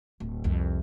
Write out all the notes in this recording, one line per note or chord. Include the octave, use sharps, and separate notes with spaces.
D1
C2 F2